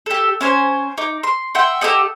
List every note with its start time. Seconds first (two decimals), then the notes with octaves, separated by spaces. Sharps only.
0.06 G4 A4
0.41 C#4 C5 G#5
0.98 D#4 D6
1.23 C6
1.55 E5 F#5 G5 C6
1.81 G4 A4 D#5 F#5